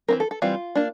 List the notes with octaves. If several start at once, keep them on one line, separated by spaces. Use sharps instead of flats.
E3 G3 C4 A#4
A4
A4
E3 G3 C4 F4
A#3 D4